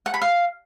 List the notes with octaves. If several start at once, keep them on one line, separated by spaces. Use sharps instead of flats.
F#5
B5
F5